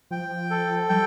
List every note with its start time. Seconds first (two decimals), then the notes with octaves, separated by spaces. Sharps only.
0.11 F3 G5
0.51 A4
0.89 G3 G5